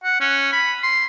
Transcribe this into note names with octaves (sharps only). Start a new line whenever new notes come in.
F#5
C#4
B5
C6